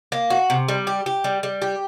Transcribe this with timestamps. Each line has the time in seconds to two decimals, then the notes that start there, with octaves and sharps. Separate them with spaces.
0.12 A#3
0.30 F#4
0.50 C3
0.68 G3
0.87 G4
1.06 G4
1.24 G3
1.43 G3
1.62 G4